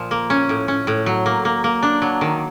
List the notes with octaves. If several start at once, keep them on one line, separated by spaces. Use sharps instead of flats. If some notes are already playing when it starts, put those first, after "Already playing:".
Already playing: A#2 F3
A#3
C#4
A2
C#4
A2
F#3
A#3
A#3
A#3
D4
F#3
D#3